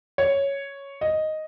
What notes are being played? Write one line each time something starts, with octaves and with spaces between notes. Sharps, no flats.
C#5
D#5